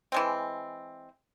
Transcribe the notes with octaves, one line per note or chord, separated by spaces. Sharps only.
E3 G#3 C4